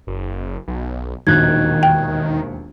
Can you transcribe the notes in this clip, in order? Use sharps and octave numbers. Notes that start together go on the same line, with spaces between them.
F#1
B1
E1 A#1 D#2 D#3 F#6 G#6
G5